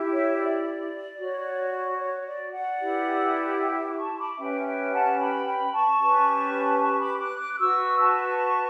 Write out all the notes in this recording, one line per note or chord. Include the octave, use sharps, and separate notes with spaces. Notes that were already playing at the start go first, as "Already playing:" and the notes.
Already playing: E4 G4
C#5 E5
D5
F#4 C#5
C#5
D5
D5 F#5
E4 G4 B4
E5 G5
D6
A5 C#6
C#6
B5 D6
C#4 G4 B4 E5 G5
E5 G5
F#5 A5
G5 B5
G5 B5
A5 C#6
C#4 G4 B4
A5 C#6
B5 D6
D6 F#6
D6 F#6
F#6
F#4 B4 C#6 E6
A5 C#6